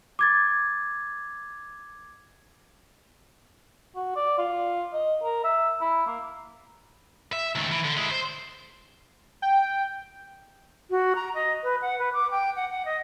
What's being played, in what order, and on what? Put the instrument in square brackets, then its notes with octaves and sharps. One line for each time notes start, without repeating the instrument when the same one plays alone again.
[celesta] D6 G#6 A6
[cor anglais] F#4
D5
F4
D#5
A#4
E5
E4
A#3
[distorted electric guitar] E5
C#2 D#3
E3
D3
G#3 E4
C5
[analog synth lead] G5
[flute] F#4
A#5
D#5
B4
F#5
B4
D6
G5
F#5
F#5
D#5